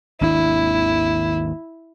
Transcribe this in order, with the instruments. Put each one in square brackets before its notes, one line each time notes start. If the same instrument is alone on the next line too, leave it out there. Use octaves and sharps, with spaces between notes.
[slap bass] G#1 D#2 D4 [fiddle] E4